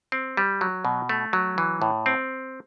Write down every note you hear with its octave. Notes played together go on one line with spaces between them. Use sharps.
C4
G3
F#3
B2
A3
F#3
E3
A2
C4